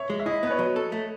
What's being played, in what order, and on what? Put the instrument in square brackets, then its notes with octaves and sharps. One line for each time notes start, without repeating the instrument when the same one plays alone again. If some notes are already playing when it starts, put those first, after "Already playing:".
Already playing: [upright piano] C#5 E5
[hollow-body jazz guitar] G#3
[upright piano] E5
[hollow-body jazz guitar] E4 [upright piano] D#5
[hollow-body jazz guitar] B3 [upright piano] B4
[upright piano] C#5
[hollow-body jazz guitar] F#3
A4
A3